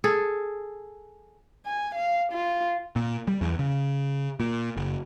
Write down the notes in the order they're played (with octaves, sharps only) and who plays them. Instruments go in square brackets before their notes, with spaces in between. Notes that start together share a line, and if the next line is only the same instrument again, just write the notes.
[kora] G#4 A4
[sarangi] G#5
F5
F4
[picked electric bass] A#2
G3
E2
C#3
A#2
F#1